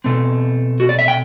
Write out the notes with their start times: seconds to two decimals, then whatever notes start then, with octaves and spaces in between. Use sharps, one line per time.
0.04 B2 A3 C4
0.80 F#4
0.89 D5
0.99 E5
1.08 G5